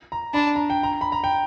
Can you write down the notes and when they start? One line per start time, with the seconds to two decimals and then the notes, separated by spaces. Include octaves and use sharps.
0.12 A#5
0.34 D4 B5
0.56 A#5
0.70 G5
0.83 A#5
1.01 B5
1.12 A#5
1.24 G5